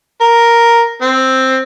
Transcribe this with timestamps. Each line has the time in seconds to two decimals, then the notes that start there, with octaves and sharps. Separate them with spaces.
0.21 A#4
1.02 C4